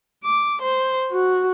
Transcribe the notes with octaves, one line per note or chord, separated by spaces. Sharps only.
D6
C5
F#4